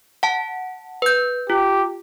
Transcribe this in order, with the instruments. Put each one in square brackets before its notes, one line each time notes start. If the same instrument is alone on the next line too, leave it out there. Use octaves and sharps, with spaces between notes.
[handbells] F#5 A5
B4 G6
[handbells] F4 [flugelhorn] G4